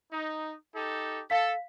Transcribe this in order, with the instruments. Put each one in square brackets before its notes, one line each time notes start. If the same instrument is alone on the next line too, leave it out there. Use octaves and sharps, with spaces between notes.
[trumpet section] D#4
D#4 G4 A4
[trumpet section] A4 [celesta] F5 B6